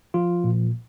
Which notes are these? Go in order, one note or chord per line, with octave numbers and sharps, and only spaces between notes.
F3 F4
A#2